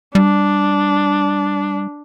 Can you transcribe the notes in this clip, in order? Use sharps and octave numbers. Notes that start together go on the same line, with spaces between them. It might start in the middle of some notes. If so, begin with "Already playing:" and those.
G3 D4